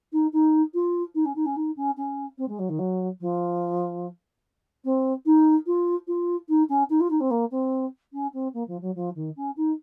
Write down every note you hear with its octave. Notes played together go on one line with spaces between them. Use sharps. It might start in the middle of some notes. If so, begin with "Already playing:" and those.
D#4
D#4
F4
D#4
C#4
D#4
C#4
D#4
C#4
C#4
C4
G#3
F#3
D#3
F#3
F3
C4
D#4
F4
F4
D#4
C#4
D#4
F4
D#4
C4
A#3
C4
C#4
C4
A#3
F3
F#3
F3
D#3
C#4
D#4